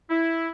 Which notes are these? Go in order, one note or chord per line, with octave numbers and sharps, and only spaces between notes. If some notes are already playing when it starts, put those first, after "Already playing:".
E4